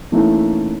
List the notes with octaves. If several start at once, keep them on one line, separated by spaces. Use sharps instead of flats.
E3 A3 A#3 C#4 D#4 E4